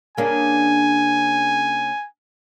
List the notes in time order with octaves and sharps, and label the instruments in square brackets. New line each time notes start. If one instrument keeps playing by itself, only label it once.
[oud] C#3 A#3 D4 [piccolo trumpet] G#5